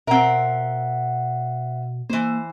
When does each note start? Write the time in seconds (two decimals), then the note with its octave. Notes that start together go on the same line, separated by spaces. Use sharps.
0.07 B2 C4 A#4 E5 F#5
2.09 E3 A#3 C5